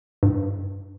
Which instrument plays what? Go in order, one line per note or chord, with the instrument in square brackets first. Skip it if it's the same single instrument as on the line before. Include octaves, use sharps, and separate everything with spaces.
[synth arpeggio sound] G2